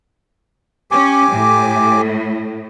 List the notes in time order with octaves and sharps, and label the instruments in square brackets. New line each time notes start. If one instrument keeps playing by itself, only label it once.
[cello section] C#4 [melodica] G4 G#5 D6
[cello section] A2